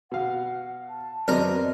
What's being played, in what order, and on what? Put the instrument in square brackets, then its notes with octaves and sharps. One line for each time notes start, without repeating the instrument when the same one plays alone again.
[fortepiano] B2 F5 [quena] F#5
[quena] A5
[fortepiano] F#2 B3 C4 [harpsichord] A#4 [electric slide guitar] D5 D#5